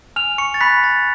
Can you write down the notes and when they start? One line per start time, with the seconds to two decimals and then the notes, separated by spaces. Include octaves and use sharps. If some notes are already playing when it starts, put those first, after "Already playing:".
0.16 G#5 F6 F7
0.38 C#6 C#7
0.54 A6
0.60 B5 C#6 F#6 B6
0.84 A6